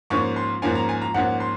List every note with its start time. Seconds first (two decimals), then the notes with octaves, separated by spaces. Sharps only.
0.10 G#2 F3 A#3 C#4 C#6
0.36 C6
0.62 G#2 F3 A#3 C#4 G#5
0.75 A#5
0.89 G#5
1.02 A#5
1.14 G#2 F3 A#3 C#4 F#5
1.40 C6